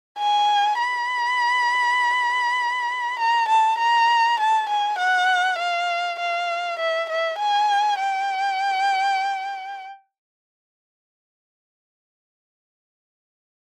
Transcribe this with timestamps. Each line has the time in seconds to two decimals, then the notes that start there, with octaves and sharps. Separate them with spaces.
0.18 G#5
0.80 B5
3.19 A#5
3.48 A5
3.78 A#5
4.39 A5
4.69 G#5
4.99 F#5
5.59 F5
6.19 F5
6.79 E5
7.09 E5
7.39 G#5
7.99 G5